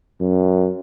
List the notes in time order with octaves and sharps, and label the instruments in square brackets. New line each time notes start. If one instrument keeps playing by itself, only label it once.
[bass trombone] F#2